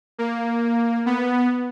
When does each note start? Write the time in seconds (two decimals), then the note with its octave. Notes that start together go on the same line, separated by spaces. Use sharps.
0.18 A#3
1.06 B3